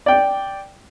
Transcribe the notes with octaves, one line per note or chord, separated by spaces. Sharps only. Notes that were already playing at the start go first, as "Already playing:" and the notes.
D5 G5